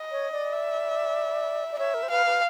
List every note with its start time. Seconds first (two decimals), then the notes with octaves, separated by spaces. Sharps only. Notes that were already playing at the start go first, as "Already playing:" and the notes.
Already playing: D#5
0.11 C#5
0.32 D5
0.53 E5
1.72 D5
1.79 C#5 E5
1.94 A#4
2.03 C5
2.10 B4 F5
2.26 B4